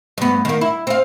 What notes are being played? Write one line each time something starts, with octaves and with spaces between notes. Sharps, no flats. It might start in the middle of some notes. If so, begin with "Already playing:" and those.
G2 B3
D#3 A#3
E4
C4 F5